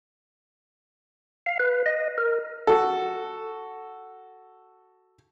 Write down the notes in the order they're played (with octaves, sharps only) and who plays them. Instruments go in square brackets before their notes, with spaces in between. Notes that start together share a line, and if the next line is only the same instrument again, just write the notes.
[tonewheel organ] F5
B4
D#5
A#4
[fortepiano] F#4 A4